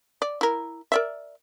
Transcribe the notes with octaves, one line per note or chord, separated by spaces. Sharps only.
D5
E4 A#4
A#4 D5 E5